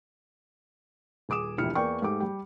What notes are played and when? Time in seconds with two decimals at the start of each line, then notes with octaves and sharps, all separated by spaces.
1.29 D#1 G#4 D6 D#6 E7
1.58 E1 A#1 E4 G4 F6 C#7
1.75 E2 A#3 D5 G5 C#6
2.02 G#2 A3 G4 D6
2.20 G3 G4